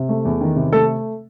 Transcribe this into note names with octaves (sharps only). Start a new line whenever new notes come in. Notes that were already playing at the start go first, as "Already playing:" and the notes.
Already playing: C3
A3
E2
D#3
C3
A3 A4